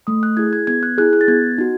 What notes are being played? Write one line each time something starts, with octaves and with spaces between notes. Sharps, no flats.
A3 D#6
F#6
E4 G#4 G#6
G#6
B3 G#6
F#6
E4 G#4 F#6
F#6
A6
B3 G#6
D#4 F#4